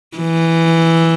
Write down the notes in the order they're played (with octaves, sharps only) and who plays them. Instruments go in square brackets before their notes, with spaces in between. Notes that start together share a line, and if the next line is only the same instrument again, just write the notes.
[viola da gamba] E3